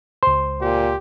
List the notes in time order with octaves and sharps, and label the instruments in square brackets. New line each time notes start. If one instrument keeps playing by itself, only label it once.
[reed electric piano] C#2 C6 [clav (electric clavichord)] C5
[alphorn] A#2 [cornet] G4